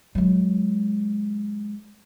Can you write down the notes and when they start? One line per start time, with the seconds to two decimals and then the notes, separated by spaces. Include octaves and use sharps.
0.15 F#3 G#3